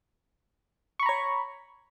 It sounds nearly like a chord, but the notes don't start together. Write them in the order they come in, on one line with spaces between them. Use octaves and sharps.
C#6 B5 A#5 C#5